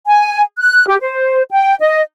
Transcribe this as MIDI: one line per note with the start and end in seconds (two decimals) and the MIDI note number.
0.07 0.42 80
0.58 0.85 90
0.88 0.96 67
1.01 1.43 72
1.51 1.74 79
1.81 2.01 75